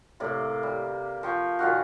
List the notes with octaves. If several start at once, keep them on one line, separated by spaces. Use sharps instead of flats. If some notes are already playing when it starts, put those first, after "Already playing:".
A2 C3 A#3 D5
G3
F3 G5 C#6
A#2 D#3 F4 F#4